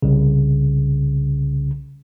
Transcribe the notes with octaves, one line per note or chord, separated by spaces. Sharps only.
C2 C#3